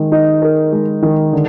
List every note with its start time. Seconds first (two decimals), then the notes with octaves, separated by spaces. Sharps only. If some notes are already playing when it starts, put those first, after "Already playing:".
Already playing: D#3 G#3
0.12 D#4
0.42 A#4
0.72 G#3
1.02 D#3
1.33 D3